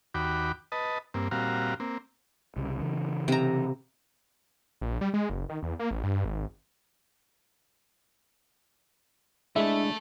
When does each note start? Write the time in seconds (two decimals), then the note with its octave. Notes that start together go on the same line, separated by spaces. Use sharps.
0.14 D#2 F#4 G5 B5 D6
0.72 B4 D#5 A5
1.14 G2 A#3 C4
1.31 A#2 G3 C4 F#4 F5 A#5
1.80 A#3 C4
2.56 C2 C#3
2.80 C#3 E3 F#3
3.28 C3 A#5
4.81 A#1
5.01 G3
5.14 G#3
5.30 F#1
5.49 D#3
5.63 E2
5.79 A#3
5.91 A1
6.04 G2
6.25 G#1
9.56 G#3 A3 D4 E4 A4 E5